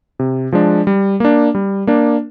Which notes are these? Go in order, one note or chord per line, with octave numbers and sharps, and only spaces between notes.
C3
F3 G#3 D4
G3
A#3 D4
G3
A#3 D4